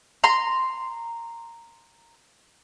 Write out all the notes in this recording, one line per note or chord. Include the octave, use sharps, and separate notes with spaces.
A#5 C6